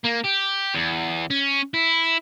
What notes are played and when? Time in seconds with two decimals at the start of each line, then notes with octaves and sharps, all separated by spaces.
0.04 A#3
0.24 G4
0.74 E2
1.30 C#4
1.74 E4